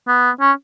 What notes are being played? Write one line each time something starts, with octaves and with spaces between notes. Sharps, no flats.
B3
C#4